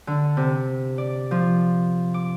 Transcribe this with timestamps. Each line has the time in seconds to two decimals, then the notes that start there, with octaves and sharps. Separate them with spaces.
0.07 D3
0.37 C3
0.98 D5
1.31 F3
2.14 D6